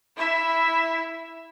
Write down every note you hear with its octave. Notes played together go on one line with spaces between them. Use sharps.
E4 E5